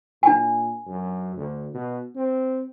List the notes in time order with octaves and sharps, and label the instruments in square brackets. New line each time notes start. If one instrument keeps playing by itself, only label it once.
[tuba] A#2 [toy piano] D4 G#5
[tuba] F#2
D2
B2
C4